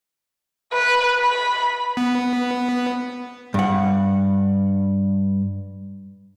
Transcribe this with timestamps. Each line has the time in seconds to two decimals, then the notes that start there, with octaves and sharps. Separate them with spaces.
0.73 B4
1.21 B5
1.97 B3
3.54 G2 F#5